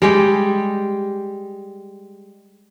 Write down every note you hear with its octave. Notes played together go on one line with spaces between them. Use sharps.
G3 G#3 G4